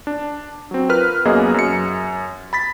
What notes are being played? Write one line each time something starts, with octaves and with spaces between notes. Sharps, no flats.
D4
F#3 C4
F4 A#4 B4 F6
F#2 A#3 B3 G#4 D#5
F#2 C#7
B5 A6 B6